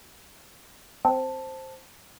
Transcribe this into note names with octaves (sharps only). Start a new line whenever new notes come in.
C4 C5 A5